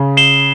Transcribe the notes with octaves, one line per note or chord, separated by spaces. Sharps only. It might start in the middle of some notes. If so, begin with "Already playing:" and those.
Already playing: C#3
C7 E7 G7